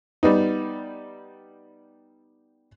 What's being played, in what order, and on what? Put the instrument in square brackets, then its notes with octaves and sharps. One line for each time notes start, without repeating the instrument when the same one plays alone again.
[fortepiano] G3 B3 D#4